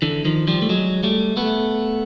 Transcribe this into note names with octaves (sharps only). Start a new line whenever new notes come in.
D3 E3
D#3 F3
F3 G3
A3
F#3 G#3
G3 A3
A3 B3